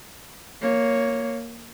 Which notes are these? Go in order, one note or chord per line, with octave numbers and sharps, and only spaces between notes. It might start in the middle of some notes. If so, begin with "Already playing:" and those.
A#3 C#5